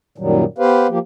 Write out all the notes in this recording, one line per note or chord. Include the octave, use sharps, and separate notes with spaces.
F#2 A#2 D#3 F#3 G3
B3 G4 B4 C5 F5
F3 A#3 G4